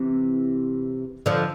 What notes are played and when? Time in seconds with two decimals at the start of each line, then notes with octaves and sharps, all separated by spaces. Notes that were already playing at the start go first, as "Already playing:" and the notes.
Already playing: C3 E3
1.26 D3 F3